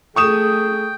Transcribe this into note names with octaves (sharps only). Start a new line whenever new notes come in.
A3 G#4 G5 C#6 D#6 E7